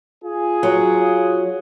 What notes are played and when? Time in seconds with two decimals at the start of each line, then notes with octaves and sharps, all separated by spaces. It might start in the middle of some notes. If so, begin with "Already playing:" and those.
0.23 F4 G#4
0.63 F#3